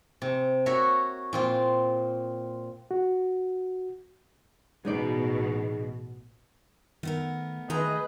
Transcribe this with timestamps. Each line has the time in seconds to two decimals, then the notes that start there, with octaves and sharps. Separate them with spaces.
0.22 C3
0.66 F#4 A#4 C#5 E5 F#5
1.33 A#2 C4 F4
2.91 F#4
4.85 A1 B2 G#3 D#4 D5
7.03 D#3 A3 B3 A#4
7.70 D#3 A3 G#4 B4 D#5 G5 A#5